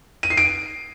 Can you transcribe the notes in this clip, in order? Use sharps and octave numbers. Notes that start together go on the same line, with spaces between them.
D#7
C7
D7